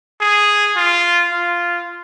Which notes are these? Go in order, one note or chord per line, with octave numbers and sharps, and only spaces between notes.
G#4
F4
F4